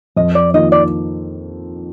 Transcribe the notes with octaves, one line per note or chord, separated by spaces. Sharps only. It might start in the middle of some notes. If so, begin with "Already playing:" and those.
F2 D#5
D5
D#3 A#3 F4 D#5
D5